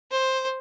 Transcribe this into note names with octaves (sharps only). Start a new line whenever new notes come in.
C5